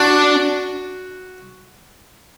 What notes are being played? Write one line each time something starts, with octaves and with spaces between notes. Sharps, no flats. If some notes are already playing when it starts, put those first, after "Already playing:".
Already playing: D4 F#4